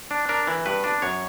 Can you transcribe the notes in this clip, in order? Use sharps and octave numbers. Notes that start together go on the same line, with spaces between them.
D4
D4 A#4
E3
G2 B4
D4
F#2 C#5